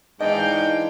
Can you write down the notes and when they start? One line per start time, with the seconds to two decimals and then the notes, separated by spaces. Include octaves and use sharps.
0.20 G#2 E3 D4 D#5 F5 G5